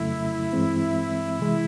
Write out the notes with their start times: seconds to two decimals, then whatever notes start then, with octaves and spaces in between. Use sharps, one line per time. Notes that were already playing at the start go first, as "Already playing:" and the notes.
Already playing: F2 C#3 F#3 A3 E4
0.53 G2 E3 G#3 C4
1.39 C3 E3 G#3